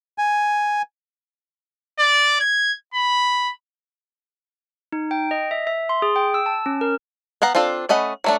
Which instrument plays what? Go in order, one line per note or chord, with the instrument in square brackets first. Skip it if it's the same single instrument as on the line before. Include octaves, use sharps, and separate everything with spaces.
[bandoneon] G#5
[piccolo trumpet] D5
G#6
B5
[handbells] D#4
G5
D#5
E5
E5
C6
G#4
G5
E6
A5
C#4
A#4
[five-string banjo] B3 F5 F#5 A#5
C4 D4 F4 A4
A3 C#4 D#5 F#5 B5
F#3 A3 D4